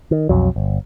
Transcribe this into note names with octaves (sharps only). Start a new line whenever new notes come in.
D#3
B1 F2 F#3
G1